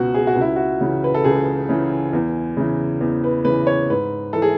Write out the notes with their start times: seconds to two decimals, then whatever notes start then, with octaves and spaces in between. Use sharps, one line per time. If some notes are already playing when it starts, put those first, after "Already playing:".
Already playing: C#2 B2 F#4
0.14 G#4
0.27 F#4
0.36 C#2
0.41 E4
0.56 F#4
0.81 C#3 E3
1.04 B4
1.14 A4
1.24 C#2 G#4
1.69 C#3 E3
2.13 E2
2.57 C#3 E3
3.01 E2
3.24 B4
3.45 C#3 E3 B4
3.67 C#5
3.90 G#2 B4
4.33 E3 A4
4.42 G#4